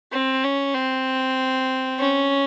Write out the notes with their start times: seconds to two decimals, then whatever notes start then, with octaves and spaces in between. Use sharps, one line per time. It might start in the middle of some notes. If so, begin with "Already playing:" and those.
0.13 C4
0.44 C#4
0.75 C4
1.99 C#4